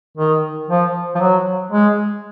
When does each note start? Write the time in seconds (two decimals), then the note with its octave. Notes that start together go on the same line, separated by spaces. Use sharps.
0.17 D#3
0.69 F3
1.15 F3
1.20 F#3
1.72 G#3